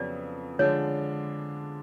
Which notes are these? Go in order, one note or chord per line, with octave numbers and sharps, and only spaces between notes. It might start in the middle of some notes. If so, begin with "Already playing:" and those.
Already playing: F2 C#3 F#3 B3 D5
D3 F3 G#3 D4 C#5